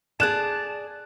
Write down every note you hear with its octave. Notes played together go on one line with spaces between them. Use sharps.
G#4 D5 A5 F#6 E7